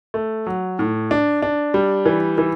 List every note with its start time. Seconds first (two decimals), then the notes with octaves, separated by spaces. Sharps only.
0.14 A3
0.47 F#3
0.79 A2
1.11 D4
1.42 D4
1.74 G3
2.06 E3
2.38 E3